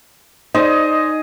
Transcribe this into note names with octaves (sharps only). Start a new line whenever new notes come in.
D#4 G#4 C5 D5 D#5